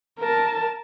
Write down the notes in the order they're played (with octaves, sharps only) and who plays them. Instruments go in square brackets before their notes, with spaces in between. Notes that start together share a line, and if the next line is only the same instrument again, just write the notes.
[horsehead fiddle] A#4 A5